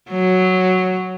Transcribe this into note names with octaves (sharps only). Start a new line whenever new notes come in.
F#3